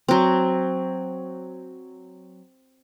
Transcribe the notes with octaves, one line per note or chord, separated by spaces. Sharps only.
F#3 C4